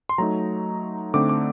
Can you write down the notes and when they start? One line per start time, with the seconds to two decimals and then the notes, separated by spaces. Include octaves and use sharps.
0.09 C6
0.18 F#3 A3 D#4 A#5
1.14 D3 A3 C4 D#4 D6
1.29 D6